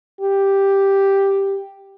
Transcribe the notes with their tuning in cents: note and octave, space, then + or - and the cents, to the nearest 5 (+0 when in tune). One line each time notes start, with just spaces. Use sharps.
G4 +0